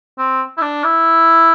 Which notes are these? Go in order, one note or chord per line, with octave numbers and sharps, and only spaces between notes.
C4
E4
D4
E4